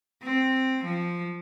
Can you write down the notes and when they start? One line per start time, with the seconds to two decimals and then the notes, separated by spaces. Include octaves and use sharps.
0.23 C4
0.84 F3